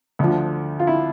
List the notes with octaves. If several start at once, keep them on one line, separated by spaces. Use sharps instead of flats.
D2 D3 F3
F4
E4